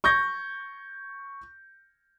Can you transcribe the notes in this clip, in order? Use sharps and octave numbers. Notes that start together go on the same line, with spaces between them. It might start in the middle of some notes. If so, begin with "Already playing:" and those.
C#6 G6 G#6 A#6